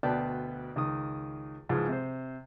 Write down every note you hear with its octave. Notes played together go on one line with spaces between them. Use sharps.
D2 B2 B4 D5 G5 A5
C#2 D#3 D#6
C#2 G#2 E3 F3 G#3
C3 C5